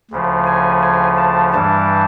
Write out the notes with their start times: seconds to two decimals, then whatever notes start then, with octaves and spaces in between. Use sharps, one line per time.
0.11 D2 C#3 F3
0.46 G#5
0.82 G#5
1.18 A5
1.54 G2 E3 G3 A5